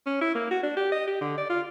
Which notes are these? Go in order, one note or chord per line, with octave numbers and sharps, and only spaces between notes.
C#4
E4
A#3
F#4
D4
G4
D#5
G4
D3
D5
F4